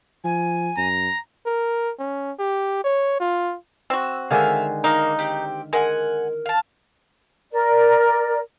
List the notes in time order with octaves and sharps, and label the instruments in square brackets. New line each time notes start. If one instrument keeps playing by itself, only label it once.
[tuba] F3 [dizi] G#5
[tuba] F#2 [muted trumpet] A#5
[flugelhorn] A#4
C#4
G4
C#5
F4
[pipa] C4 F#4 [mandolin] E6
[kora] D3 D#3 G#3 [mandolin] E5 F5
[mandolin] A#3 [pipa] D#4 [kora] F5
[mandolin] C4 G4
[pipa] G#3 [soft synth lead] A#4 [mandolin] E5 F#5 G#5
[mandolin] F5 A5
[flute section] A#4 D5